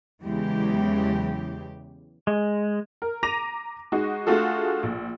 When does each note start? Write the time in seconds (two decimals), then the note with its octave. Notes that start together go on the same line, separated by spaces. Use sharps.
0.24 E2 C#3 E3 F#3 G#3 G4
2.27 G#3
3.02 A#4
3.23 A#5 D6 A#6 D#7 F7
3.92 G#3 D#4 F#4
4.27 A3 D4 F4 F#4 G#4 A4
4.83 A#1